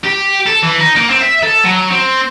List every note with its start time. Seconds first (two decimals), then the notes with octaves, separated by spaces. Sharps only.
0.04 G4
0.46 A4
0.62 E3
0.80 D#4
0.96 A#3
1.10 C4
1.21 E5
1.43 A4
1.64 F#3
1.91 C4